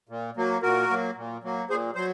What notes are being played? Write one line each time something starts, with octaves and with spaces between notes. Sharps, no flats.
A#2
F#3 A#3
A#2 F#4 A#4
F#3 A#3
A#2
F#3 A#3
A#2 G#4 C5
F#3 C5